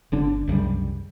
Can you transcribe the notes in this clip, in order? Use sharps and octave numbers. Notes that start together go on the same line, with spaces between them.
G1 D3 D4
C2 F#2 C#3 G3